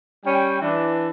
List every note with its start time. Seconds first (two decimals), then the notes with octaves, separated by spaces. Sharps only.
0.25 G3 C#4 G5
0.61 E3 D4